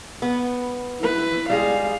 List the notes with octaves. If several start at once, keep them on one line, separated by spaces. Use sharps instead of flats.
B3
E4 B4
G3 G#3 G#4 F5